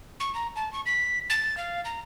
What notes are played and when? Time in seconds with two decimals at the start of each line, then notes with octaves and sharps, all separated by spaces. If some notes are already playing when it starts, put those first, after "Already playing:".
0.20 C#6
0.35 A#5
0.56 A5
0.73 C#6
0.86 B6
1.30 A6
1.57 F5
1.85 A#5